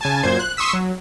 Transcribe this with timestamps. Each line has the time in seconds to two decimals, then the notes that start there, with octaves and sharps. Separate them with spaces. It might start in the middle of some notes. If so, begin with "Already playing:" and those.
0.01 C#3 G#5 A5
0.23 F#2 A#2 C5 G#6
0.39 F#6
0.57 C6 C#6 D#6 E6 B6
0.73 F#3